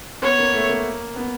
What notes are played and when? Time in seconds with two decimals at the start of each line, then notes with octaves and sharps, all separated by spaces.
0.23 B3 C#5
0.39 A#3
0.54 A3
0.69 A#3
1.16 B3